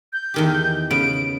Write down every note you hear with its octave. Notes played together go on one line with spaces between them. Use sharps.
G6
E2 D#3 G4
C#3 B3 D7